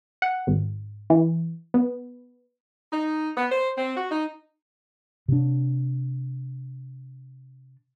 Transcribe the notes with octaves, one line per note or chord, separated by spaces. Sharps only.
F#5
G#1
E3
B3
D#4
B3
C5
C4
F#4
D#4
C3 D4